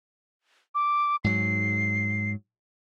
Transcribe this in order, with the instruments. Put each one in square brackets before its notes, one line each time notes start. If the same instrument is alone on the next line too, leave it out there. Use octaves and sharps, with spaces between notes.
[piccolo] D6
[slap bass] G#2 F#3 [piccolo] C7